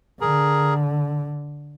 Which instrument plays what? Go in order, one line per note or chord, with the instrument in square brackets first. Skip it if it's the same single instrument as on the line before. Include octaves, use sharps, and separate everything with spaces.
[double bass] D3 [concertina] G#4 A#4